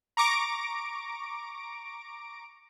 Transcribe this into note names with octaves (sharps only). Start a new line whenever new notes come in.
A#5 C#6 D6 A#6 D7